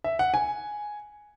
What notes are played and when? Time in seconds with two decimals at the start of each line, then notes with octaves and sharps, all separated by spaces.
0.04 E5
0.19 F#5
0.34 G#5